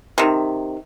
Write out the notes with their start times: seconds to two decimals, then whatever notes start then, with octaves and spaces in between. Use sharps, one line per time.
0.18 C3 D#3